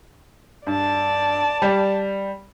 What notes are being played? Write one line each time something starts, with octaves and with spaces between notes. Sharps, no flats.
G2 D5 A5
G3